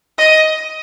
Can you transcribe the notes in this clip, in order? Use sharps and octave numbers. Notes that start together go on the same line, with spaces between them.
D#5